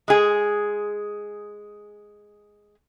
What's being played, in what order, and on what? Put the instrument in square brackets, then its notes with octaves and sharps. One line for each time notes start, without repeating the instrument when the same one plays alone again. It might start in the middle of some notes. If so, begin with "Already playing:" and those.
[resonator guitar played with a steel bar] G#3 G#4